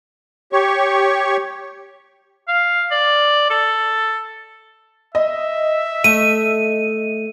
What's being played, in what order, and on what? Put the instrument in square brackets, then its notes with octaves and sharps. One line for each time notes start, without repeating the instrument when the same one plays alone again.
[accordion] G4 C#5 C#6
[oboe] F5
D5
A4
[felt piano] D#5 [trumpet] E5
[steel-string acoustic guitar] A3 [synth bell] D#7